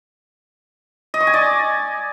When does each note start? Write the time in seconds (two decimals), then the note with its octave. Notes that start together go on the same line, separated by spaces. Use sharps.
1.14 D#5
1.20 C#6
1.27 G#5
1.34 D5